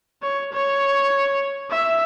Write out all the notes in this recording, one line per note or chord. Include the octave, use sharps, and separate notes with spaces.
C#5
C#5
E5